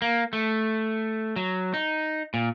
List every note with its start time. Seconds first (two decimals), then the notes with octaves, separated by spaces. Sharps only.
0.02 A#3
0.33 A3
1.36 F#3
1.74 D#4
2.34 A#2